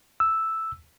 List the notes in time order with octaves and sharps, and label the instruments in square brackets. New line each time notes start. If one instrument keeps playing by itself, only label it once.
[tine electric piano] E6